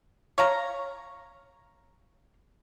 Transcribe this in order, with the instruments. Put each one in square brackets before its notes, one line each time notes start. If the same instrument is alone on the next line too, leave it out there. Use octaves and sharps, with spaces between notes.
[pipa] C#5 F5 A#5